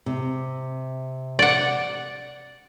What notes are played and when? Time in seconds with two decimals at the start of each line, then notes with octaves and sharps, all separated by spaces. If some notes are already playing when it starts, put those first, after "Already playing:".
0.06 C3
1.39 D5 F#5